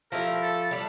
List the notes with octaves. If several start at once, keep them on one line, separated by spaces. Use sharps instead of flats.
F3 A3 E4 G4 A#4
A4
G3 D4